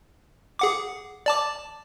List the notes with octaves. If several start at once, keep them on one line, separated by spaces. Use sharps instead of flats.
G#4 F#5 D6
D5 A5 D6